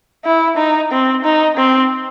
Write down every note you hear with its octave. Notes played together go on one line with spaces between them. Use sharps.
E4
D#4
C4
D#4
C4